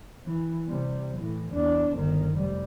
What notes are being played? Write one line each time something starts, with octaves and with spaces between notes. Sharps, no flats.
E3
C3 G3
A2 E3
E2 D4
G1 D#3
F1 G3